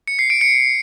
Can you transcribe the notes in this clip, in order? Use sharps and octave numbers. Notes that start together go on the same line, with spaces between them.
C#7
C7
D7
C#7